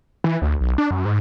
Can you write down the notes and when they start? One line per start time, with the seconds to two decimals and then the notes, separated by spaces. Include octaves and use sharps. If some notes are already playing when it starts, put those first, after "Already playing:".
0.24 E3
0.42 D2
0.61 B1
0.78 D4
0.91 F#2
1.05 G#2